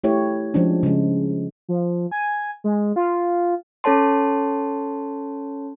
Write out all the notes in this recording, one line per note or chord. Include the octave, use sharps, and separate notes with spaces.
A3 E4 G4 C#5
F3 G#3 C#4 D4
C#3 G#3
F3
G#5
G#3
F4
C#4 A4 C#5 A5 C6